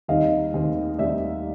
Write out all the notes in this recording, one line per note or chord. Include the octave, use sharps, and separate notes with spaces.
D#2 D#3 G3 C4 D#4 D#5 F5
D#2 D#3 G3 C4 D#4
D#2 D#3 G3 C4 D#4 D5 E5